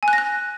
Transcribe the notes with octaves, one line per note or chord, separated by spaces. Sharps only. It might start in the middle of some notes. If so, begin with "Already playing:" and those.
G#5
F#6
A#6
F#6